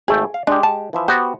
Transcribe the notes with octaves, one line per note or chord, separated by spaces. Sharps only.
G#1 A3 G#4 G5
F5
G#3 D4 G4
A5
E3 F3 E5
B3 F#4 G4 C5